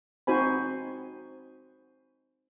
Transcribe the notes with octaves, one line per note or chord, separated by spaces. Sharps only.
C4 D#4 F#4 C5 G#5 B5